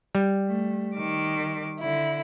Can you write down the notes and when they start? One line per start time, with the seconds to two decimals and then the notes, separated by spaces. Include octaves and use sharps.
0.15 G3
0.47 A3
0.95 D#3 D6
1.80 D3 E4